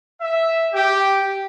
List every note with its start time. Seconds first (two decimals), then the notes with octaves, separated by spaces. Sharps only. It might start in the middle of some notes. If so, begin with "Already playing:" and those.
0.21 E5
0.73 G4